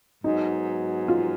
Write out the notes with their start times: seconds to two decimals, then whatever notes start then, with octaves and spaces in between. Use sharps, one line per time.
0.24 G#2 F#3 B3 D#4
1.08 F4